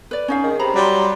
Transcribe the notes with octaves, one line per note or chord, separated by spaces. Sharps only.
B4 D5
C#4 D#4 F5
D#3 G#4
C3 A#5 B5
F#3 G3 C6